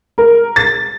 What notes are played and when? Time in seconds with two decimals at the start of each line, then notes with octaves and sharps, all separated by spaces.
0.18 A#4
0.56 A6